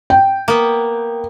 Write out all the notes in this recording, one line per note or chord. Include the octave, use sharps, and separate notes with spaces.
G5
A#3 B3